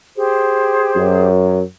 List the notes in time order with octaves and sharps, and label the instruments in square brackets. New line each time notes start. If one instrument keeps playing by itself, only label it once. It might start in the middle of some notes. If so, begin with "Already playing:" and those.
[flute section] G4 G#4 C5
[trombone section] F#2